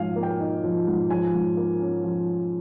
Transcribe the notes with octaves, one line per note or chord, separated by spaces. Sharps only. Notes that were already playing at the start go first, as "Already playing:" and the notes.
Already playing: G#2 F3 F5 G#5
A#3
G5
D#4
F3
G#2
F3 G#5
G#2
A#3
C#4
F3